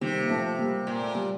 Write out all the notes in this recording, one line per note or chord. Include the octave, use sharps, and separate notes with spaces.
C3 D#3 G3
A#3
F3 A3
G3 A#3
A#2 A#3
A3
G3